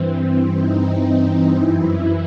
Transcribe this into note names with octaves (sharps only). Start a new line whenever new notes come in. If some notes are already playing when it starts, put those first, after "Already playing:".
Already playing: G2 E3 C4
D#4
F#2 E3 E4